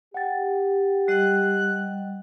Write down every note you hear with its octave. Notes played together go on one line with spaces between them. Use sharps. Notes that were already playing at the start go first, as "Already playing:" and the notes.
G4 F#5 G5 A6
G3 D#5 F#6